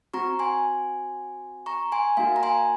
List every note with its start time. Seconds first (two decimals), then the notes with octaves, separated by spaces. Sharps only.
0.14 C4 F#4 A#5 C#6
0.39 G#5 C6
1.66 A#5 C#6
1.92 G#5 C6
2.17 A#3 D#4 F#4 F5 G#5
2.36 A#5
2.43 G#5 C6